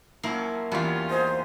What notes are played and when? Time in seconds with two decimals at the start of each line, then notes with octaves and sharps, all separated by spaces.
0.23 F3 F#3 A#3 C#4 E4
0.71 E2 G3 C#4 F4 B4
1.10 D#4 G#4 C5